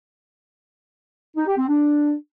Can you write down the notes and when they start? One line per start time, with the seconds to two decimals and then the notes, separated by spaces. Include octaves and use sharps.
1.37 D#4
1.47 G4
1.57 C4
1.68 D4